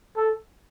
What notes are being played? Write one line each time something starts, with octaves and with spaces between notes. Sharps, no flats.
A4